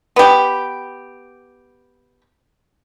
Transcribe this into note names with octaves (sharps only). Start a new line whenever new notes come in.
B3 G4